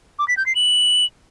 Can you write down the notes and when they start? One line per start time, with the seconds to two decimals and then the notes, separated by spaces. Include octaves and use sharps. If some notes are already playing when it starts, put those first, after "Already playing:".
0.19 D6
0.28 B6
0.37 G6
0.46 C7
0.55 F#7